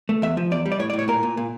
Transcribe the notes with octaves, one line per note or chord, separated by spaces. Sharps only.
A3
E2 E5
F3
E2 D5
G3
D5
A2 C#5
D5
A2
C#5
A#2 A#4
A#2
A#2